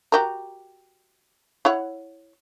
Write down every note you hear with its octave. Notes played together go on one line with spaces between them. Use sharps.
F#4 G4 A#4
E4 C#5 F#5